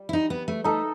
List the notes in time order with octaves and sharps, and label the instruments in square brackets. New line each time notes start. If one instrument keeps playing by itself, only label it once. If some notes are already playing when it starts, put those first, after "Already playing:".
Already playing: [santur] G3
[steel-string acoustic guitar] E4
D#4
B3
A3
[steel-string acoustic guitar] A3 [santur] D#4 A4 D#5